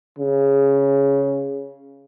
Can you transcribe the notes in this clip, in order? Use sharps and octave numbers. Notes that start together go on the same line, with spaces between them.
C#3